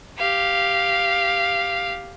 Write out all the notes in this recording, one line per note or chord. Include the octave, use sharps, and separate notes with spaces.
G4 F5